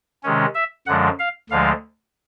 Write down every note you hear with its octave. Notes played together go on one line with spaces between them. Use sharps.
C3 D#3 G#3 C#4
E5
F#2 D3 F3 G#3 F#5
F5
D2 D3 F3 G#3 F5